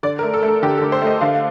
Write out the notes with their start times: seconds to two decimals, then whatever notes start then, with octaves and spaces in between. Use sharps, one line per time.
0.03 D3 D5
0.19 A#4
0.23 A3
0.34 A4
0.43 A3
0.48 A4
0.62 D3 G4
0.77 A4
0.82 D3
0.92 C5
1.02 A3
1.07 D#5
1.21 D3 F5